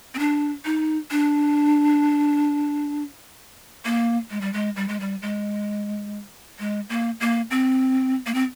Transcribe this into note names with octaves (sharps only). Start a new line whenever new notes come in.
C4
D4
D#4
D4
A#3
G#3
G3
G#3
G3
G#3
G3
G#3
G#3
A#3
A#3
C4
A#3
C4